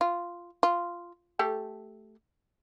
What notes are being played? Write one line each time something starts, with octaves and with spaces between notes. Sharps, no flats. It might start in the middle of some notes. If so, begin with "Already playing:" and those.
F4
F4
A3 G4 A4